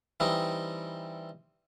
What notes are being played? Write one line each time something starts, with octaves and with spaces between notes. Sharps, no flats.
E3 G3 C4 D#4